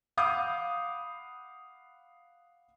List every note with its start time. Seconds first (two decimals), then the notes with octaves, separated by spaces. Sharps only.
0.17 F5 F#5 B5 D6 D#6 G6